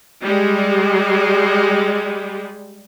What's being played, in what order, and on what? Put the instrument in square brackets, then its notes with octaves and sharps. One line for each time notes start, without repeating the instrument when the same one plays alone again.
[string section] G3 G#3